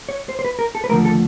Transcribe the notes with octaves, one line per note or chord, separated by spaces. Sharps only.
C#5
C5
C5
B4
A#4
A4
B4
D#2 D3 F3 A3 A#4
A4